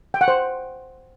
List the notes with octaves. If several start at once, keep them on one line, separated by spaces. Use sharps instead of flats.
G5
F#5
C5